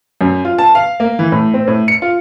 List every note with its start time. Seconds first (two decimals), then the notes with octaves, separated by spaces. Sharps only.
0.21 F#2
0.45 F4
0.58 A5
0.75 F5
1.00 A#3
1.19 E3
1.32 A2
1.54 C4
1.67 A2
1.88 C#7
2.02 F4